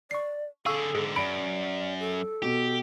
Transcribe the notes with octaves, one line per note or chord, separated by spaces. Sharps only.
D5 C#6 C7
D3 G#4 A4 F5 C#6 E6
G#2 D3 G#4
F#2 D5 B5 D7
A4
B2 G4